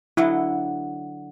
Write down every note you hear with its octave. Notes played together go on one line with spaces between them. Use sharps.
D3 F#3 E4 D#5